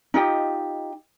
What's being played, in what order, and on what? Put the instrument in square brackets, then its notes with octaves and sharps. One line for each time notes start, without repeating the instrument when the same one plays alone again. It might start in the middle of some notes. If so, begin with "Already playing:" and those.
[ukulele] D#4 F4 G4 D#5